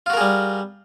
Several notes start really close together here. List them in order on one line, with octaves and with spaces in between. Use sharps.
F4 F#4 A#4 G#4 G3